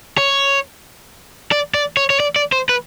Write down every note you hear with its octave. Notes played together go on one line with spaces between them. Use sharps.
C#5
D5
D5
C#5
C#5
D5
D5
C5
B4